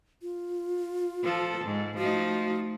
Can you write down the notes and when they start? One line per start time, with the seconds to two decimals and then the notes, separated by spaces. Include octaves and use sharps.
0.22 F4
1.23 F3 A4
1.65 G#2
1.98 F3 A3 D#4 F#4